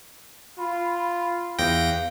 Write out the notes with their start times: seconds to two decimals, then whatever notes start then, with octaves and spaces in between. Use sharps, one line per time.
0.58 F4 B5
1.00 B5
1.59 E2 F5 G5 A#6